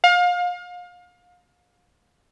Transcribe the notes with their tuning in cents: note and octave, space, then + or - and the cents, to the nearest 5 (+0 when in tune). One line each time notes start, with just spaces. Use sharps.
F5 +30